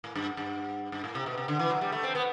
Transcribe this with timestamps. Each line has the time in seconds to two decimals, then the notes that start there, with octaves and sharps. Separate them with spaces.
0.04 A2
0.15 G2
0.37 G2
0.92 G2
1.04 A2
1.15 C3
1.26 B2
1.38 C3
1.48 D3
1.59 E3
1.70 F#3
1.81 G3
1.92 A3
2.03 C4
2.15 B3